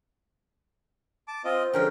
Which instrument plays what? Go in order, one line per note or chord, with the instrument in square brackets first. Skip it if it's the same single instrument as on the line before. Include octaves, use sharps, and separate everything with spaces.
[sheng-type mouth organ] A5 D6
[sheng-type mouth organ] C4 F4 D#5 [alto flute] C5
[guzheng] D3 F3 G#3 [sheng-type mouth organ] C#4 A#4 G5